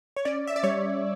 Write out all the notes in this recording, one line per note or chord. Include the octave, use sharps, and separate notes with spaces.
C#5
C#4 D5
E5
D5
G3 C#5